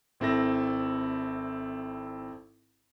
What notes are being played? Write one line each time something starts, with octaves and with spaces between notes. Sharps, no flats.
G#1 C4 E4 A4 A#6